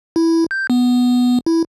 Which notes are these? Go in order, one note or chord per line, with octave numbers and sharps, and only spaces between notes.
E4
G6
B3
E4